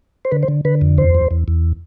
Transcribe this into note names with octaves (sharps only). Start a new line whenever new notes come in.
C5
D3 B4
C5
D3
D3 B4
F2
E2 C5
E2
E2
E2